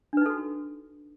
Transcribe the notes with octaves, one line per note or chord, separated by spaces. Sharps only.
D4 D#4 F#4 A4 B4